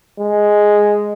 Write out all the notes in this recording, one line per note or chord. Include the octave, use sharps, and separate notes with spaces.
G#3